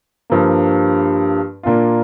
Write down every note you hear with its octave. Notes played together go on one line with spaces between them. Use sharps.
G2 F3 A#3
A#2 A#3 D4 F4